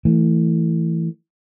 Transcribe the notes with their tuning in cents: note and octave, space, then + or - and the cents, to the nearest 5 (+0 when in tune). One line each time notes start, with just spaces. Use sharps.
E3 +0 A3 +25